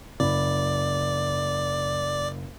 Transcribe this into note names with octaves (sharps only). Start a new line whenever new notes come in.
F#1 D5 B5